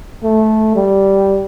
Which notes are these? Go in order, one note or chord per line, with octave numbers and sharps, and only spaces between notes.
A3
G3